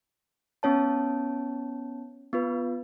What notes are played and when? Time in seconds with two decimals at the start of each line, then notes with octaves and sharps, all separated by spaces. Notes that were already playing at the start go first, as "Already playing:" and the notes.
0.63 B3 C#4 C#5 A5
2.33 B3 F4 B4